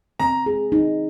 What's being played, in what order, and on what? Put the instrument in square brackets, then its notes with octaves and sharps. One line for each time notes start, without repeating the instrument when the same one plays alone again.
[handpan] C4 [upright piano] A#5
[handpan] G#4
D#4